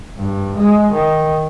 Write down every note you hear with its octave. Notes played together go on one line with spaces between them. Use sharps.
G2
G#3
D#3